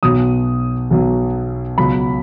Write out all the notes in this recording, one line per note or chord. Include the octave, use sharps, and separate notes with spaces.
B1 B2 F#3 D#6
B1 B2 F#3
C#2 B2 F#3 B5